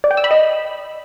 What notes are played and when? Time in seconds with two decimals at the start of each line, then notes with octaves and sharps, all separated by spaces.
0.04 D5
0.11 G5
0.17 E6
0.24 B5
0.31 D#5